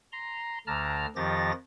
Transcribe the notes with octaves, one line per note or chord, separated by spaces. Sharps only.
A#5 C6
D2 D3 A5 A#5 F6
F2 D#3 F3 G4 A6 A#6